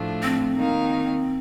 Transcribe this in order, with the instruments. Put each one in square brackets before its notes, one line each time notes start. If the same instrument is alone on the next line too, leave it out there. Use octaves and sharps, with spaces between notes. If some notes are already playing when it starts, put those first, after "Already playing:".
Already playing: [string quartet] A2 F3 A3 D4 F4
[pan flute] C4
[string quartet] D#3 A#3 D#4 A#4 F5